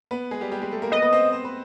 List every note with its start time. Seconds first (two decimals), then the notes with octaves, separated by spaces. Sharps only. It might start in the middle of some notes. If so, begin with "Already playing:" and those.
0.11 B3 B4
0.31 G#3 G#4
0.41 G3 G4
0.51 G3 G4
0.62 G#3 G#4
0.72 A3 A4
0.82 A#3 A#4
0.92 B3 B4 D#5
1.02 B3 B4
1.12 C4 C5
1.33 C5
1.45 B4